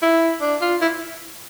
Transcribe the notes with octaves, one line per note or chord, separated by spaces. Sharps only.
E4
D4
F4
E4